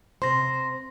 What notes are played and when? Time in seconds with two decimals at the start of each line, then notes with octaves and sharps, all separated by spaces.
0.22 C3 C5 C6 A#6